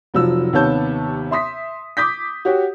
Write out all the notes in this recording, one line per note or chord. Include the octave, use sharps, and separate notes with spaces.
F1 F3 F#3 E6
D#2 C3 B3 C#5 A5 G6
E5 C6 D#6 B6
D6 D#6 G6 B6
F#4 G4 C#5